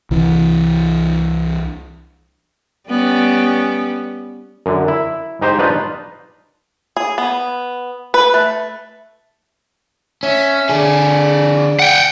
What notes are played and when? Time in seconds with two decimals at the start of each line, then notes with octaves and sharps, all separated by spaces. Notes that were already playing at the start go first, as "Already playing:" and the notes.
0.11 C2 E3
2.88 G3 B3 C#4
4.66 F#2 D3
4.88 E4
5.41 G#2 D#4 G4 C5
5.59 D4 D#4 F4 B4 C#5
6.97 G#4
7.18 B3
8.14 B4
8.34 A3
10.23 C#4 E5
10.69 D3 G#4 D5
11.79 F#5 G5